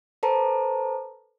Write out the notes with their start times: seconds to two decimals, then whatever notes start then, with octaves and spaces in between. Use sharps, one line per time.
0.23 A4 B4 C5 A5 A#5